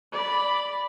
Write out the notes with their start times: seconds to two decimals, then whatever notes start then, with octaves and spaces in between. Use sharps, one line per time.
0.16 D5 B5